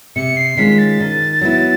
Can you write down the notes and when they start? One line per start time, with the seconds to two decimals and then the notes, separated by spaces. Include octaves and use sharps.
0.16 C3 C#7
0.37 C7
0.57 D#3 G#3 C#4 F4 B6
0.78 A6
1.00 D#3
1.41 F#3 B3 E4